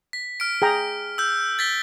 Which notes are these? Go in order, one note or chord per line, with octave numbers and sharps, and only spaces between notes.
B6
F6 D7
G#4 G5 A#5
E6 G6
A6 B6 G7